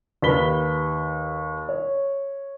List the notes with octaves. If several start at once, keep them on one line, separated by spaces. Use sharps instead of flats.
D#2 G4 B4 B5 B6 G7
C#5